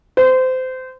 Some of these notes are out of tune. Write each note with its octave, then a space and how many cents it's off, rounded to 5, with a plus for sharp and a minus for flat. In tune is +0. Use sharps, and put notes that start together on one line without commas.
C5 -25